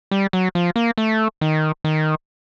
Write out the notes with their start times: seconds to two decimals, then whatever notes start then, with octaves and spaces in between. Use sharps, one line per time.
0.11 G3
0.33 F#3
0.55 F3
0.76 A#3
0.98 A3
1.41 D#3
1.84 D#3